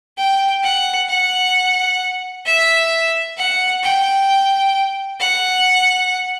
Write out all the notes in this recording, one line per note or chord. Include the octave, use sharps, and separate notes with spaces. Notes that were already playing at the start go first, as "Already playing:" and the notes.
G5
F#5
F#5
E5
F#5
G5
F#5